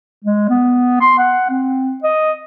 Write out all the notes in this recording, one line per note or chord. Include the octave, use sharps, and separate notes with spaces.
G#3
B3
C6
F#5
C4
D#5